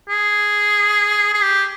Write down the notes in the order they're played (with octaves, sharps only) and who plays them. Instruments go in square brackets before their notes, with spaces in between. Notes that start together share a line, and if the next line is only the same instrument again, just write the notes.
[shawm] G#4
G#4
G4